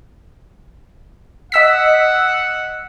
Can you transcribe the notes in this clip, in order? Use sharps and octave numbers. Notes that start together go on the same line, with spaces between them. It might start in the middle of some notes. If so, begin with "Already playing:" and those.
D#5 F#5 E6 B6